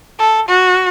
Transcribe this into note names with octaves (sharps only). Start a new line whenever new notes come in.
A4
F#4